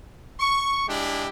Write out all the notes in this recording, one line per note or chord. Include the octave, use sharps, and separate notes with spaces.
C#6
G#3 D4 E4 G4